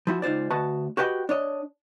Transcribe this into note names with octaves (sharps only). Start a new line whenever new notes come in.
F3 E4 F#4
C#2 D#4 F4 C5 D5
D2 F#4 B4 D#5 F#5 A5
F#4 G4 B4 D#5 F#5 G5
D4 C#5 D#5